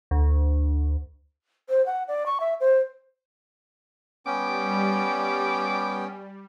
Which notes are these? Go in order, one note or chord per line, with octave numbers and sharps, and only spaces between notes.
D2
C5
F#5
D5
C#6
E5
C5
G3 B3 C#4 G5 D6